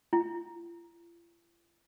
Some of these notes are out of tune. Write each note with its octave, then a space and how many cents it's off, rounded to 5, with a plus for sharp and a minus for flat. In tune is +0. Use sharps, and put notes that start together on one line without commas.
F4 -45